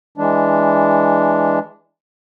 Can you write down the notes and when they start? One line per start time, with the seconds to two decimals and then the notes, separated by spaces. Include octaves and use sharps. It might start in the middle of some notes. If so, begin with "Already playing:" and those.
0.18 E3 G#3 D4